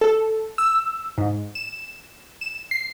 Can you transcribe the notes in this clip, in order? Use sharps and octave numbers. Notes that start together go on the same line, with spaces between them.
A4
E6
G#2
E7
E7
C7